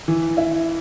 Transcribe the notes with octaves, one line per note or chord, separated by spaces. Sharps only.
E3
E4